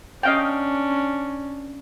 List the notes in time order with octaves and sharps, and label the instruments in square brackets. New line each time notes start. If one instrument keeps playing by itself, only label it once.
[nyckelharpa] C#4 D4 [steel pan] D#5 F5 G5